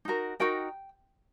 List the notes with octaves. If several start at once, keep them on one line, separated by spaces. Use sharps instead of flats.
D#4 F#4 A#4
D#4 F#4 A#4 G5